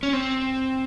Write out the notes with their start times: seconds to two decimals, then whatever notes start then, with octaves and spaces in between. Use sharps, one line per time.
0.03 C#4
0.13 C4